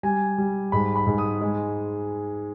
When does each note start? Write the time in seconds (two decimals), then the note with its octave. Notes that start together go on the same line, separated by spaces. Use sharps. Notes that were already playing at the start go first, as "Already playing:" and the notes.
0.03 G3 G#5
0.38 G3
0.72 G#2 B5
0.96 B5
1.07 G#2
1.18 D#6
1.41 G#3